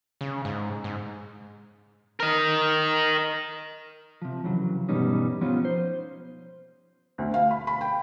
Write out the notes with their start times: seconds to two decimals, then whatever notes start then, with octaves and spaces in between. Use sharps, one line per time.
0.21 C#3
0.45 G#2
0.84 G#2
2.20 A#4 D#5
4.22 C3 F3
4.44 F2 C#3 E3 F#3
4.89 E2 G2 B2 G3 C#4 D#4
5.41 F3 B3 C#4 D#4 F4
5.65 C5
7.18 D2
7.34 F5
7.51 B5
7.67 B5
7.81 G5